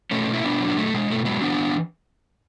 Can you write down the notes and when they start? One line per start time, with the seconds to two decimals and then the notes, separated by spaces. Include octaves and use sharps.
0.11 B2 A3 C#4
0.27 B2
0.34 E4
0.44 B2 B3 D4
0.60 F#3
0.68 B3
0.77 B2 A3
0.94 B2 G#3
1.10 B2 A3
1.25 F#3 G#3 B3
1.42 E3 B3 D4
1.59 E3